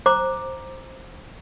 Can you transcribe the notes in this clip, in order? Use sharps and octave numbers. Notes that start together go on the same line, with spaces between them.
C5 A#5 D6